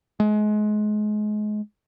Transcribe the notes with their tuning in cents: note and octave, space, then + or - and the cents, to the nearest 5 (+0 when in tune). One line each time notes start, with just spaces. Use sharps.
G#3 +30